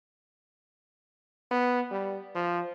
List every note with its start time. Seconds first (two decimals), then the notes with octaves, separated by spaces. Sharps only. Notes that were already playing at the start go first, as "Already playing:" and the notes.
1.51 B3
1.91 G3
2.35 F3